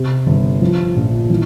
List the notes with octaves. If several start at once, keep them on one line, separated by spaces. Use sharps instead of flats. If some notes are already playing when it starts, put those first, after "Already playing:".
Already playing: C3
G1
F3
A#1
E3